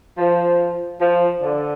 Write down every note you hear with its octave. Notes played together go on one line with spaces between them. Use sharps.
F3
F3
D3